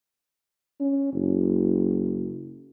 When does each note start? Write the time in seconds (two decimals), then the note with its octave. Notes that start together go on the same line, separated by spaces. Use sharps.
0.81 C#4
1.13 F#1